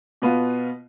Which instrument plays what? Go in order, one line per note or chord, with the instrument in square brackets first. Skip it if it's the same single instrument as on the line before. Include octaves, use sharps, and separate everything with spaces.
[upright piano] B2 B3 F4